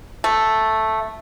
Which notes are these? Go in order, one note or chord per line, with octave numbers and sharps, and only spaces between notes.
A3